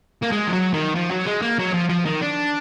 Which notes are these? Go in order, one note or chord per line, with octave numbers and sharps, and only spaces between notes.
A#3
G#3
F3
F#3
D#3
F3
F#3
G#3
A#3
F#3
F3
F3
D#3
D4